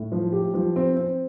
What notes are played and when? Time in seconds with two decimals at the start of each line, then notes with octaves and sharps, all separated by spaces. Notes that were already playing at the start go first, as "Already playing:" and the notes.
Already playing: A2
0.12 F3
0.32 G4
0.54 F3
0.76 C4
0.96 C4